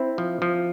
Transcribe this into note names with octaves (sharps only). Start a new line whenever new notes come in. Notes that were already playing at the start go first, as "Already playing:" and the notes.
Already playing: C4 E4
F3
F3